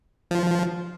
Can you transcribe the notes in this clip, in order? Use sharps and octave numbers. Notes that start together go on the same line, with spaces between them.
F3